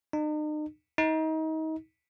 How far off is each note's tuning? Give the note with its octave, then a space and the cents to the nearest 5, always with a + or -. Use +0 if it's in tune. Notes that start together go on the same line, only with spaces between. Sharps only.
D#4 -40
D#4 +30